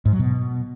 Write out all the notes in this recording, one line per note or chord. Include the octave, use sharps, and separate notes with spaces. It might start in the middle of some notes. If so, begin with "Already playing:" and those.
G#2
F#3
B2